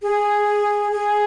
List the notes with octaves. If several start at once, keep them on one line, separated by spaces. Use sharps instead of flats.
G#4
G#4